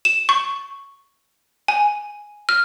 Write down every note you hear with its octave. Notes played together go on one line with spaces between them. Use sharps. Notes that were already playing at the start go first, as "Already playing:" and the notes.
E7
C#6
G#5
F6